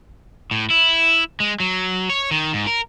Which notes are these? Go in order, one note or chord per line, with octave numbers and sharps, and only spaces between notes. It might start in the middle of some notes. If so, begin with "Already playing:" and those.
A2
E4
G#3
F#3
C#5
D#3
G#2
A#4